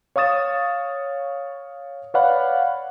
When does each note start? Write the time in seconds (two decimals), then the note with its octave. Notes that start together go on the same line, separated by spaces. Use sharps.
0.16 C#5 F5 C#6 D#6 A6 E7
2.14 B4 C#5 D5 F5 F#5 B5